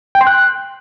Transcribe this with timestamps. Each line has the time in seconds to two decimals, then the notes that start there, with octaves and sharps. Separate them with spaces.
0.15 G5
0.21 C6
0.27 F#6